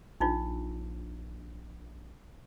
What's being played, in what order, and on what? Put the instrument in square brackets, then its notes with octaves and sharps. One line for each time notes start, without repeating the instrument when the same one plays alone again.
[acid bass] A#1 [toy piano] D4 D#4 F4